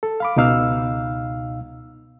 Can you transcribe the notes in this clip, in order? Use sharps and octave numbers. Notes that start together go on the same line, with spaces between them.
A4
F5 B5 D6
C#2 B2 D#4 F5 E6 F6